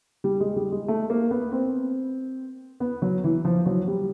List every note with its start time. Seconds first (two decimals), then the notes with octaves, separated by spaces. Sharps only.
0.24 G3
0.40 G#3
0.56 G3
0.72 G#3
0.88 A3
1.10 A#3
1.31 B3
1.52 C4
2.80 B3
3.02 F#3
3.24 E3
3.45 F3
3.66 F#3
3.88 G3